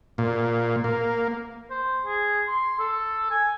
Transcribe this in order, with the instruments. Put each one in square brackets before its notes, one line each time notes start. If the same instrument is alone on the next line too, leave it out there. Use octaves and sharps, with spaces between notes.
[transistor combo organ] A#2
A#3
[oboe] C5
G#4
C6
A4
G#5